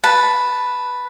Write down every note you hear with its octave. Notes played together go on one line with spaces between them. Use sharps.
B4 A5